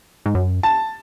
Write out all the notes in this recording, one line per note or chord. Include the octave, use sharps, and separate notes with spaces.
G#2
F#2
A5